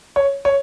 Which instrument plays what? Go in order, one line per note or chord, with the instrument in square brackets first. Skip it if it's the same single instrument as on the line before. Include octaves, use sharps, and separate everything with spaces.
[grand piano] C#5
C#5